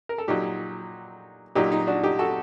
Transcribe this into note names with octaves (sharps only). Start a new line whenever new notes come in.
A#4
A4
A#2 F#3 D#4 G4
A#2 F#3 D#4 G4
D#4
D4 F#4
D#4 G4
F#4 A4